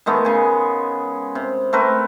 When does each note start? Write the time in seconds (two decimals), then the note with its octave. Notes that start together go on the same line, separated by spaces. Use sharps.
0.06 D#3 G#3 A3 B3
0.25 C#3 G#5
1.35 C3
1.73 A3 C4 A#4 B4